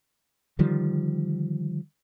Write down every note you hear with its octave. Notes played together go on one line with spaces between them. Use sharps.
D3 D#3 F3 G3